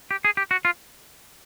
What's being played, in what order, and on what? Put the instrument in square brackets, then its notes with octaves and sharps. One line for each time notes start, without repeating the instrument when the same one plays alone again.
[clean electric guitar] G4
G#4
G4
F#4
F4